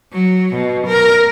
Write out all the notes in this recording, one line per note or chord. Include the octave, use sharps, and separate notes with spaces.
F#3
B2
A#4